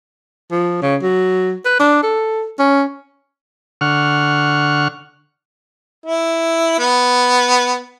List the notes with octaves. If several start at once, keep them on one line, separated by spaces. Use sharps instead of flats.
F3
C#3
F#3
B4
D4
A4
C#4
D3 F#5 C#6 F6
E4
B3